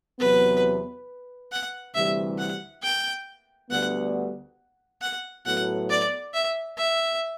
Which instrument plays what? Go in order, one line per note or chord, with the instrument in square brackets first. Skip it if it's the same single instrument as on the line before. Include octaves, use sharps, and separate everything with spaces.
[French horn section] E2 C3 F#3 B3 [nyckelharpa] B4
[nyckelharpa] F#5
[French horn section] D2 C3 E3 G3 [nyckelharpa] E5
[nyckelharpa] F#5
G5
[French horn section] D2 D3 G3 B3 [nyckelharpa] F#5
[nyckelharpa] F#5
[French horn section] A2 F#3 B3 F#4 A4 [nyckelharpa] F#5
[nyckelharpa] D5
E5
E5